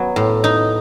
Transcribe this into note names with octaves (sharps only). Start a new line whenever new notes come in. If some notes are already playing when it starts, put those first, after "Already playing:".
Already playing: F#3 B3
A2
D#4